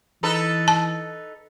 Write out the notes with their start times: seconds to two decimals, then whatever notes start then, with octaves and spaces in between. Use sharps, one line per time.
0.23 E3 D#4 A4 B4
0.68 A5